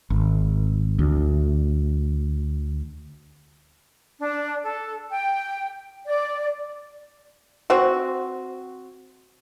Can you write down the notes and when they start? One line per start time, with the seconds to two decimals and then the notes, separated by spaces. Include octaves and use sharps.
0.10 G#1
0.99 D2
4.20 D4
4.63 A4
5.11 G5
6.06 D5
7.70 C4 F#4